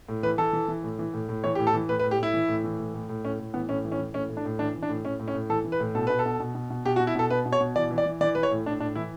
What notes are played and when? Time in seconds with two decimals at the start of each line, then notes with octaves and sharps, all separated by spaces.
0.09 A2
0.23 E3 B4
0.38 E3 A4
0.53 E3
0.68 E3
0.84 A2
0.99 E3
1.14 A2
1.29 A2
1.44 E3 C#5
1.55 A2 G4
1.67 A4
1.74 E3
1.89 A2 B4
2.00 B4
2.03 A2
2.11 G4
2.19 A2 E4
2.34 E3
2.49 A2
2.64 E3
2.79 A2
2.94 A2
3.09 A2
3.25 A2 C#4
3.39 A2
3.54 E3 B3
3.69 A2 C#4
3.85 E3
3.92 C#4
3.99 E3
4.14 A2 C#4
4.29 A2
4.37 D4
4.45 A2
4.59 E3 D4
4.75 E3
4.83 D4
4.90 A2
5.05 A2 C#4
5.20 A2
5.28 C#4
5.34 A2
5.49 E3 A4
5.65 E3
5.72 B4
5.80 A2
5.95 B2 A4
6.07 B2 B4
6.19 A4
6.26 B2
6.40 B2
6.55 B2
6.70 B2
6.85 B2 G4
6.96 F#4
7.00 B2
7.07 E4
7.15 B2 A4
7.30 B2 B4
7.46 B2
7.52 C#5
7.60 B2
7.76 E3 D5
7.91 E3
7.98 D5
8.06 E3
8.21 E3 D5
8.35 E3 B4
8.43 C#5
8.51 A2
8.66 A2 D4
8.80 A2 D4
8.95 E3 E4